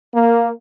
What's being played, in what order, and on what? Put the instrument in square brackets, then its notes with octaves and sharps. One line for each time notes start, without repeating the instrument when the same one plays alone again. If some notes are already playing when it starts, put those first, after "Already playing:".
[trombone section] A#3